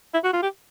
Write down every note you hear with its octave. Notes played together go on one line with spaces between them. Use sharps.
E4
F#4
F4
G4